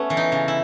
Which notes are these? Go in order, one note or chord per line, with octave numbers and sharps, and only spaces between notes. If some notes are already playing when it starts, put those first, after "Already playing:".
Already playing: A3 B3 C#4
E3
D#4
C#3
E4